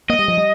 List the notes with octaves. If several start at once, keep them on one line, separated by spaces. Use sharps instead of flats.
A#3 D#5
G3
F3
G3